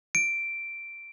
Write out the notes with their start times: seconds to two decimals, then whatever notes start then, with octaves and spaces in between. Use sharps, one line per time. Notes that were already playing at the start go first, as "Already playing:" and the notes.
0.15 D7